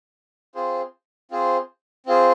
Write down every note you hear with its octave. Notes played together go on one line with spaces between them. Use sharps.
C4 F4 G#4 C5
C4 F4 G#4 C5
C4 F4 G#4 C5